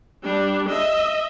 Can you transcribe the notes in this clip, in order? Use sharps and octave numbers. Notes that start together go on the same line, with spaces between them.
G3 D4
D#5 E5